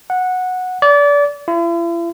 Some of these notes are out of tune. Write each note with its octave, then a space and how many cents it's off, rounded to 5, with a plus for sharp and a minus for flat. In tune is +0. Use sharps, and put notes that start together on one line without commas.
F#5 -10
D5 -30
E4 +45